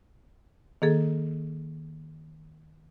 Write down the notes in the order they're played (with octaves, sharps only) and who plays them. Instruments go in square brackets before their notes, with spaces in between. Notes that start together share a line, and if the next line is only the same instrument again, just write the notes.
[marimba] D#3 A#3 G#4 A4